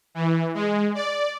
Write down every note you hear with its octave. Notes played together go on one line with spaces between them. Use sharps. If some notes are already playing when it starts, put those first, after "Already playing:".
E3
G#3
D5